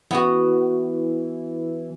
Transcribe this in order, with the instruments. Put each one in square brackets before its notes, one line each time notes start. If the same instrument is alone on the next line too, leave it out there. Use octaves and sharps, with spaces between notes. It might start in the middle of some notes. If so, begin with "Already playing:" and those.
[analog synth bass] E3 [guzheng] B3 F#4